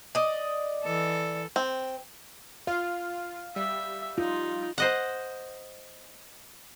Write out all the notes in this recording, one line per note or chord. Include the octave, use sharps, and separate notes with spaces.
D5 D#5
E3 A4
C4
F4 F5
G3 E5
D#4 F4
C5 D#5 F#5